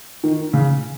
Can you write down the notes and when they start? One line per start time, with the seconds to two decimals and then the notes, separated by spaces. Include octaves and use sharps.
0.23 D#3
0.53 C#3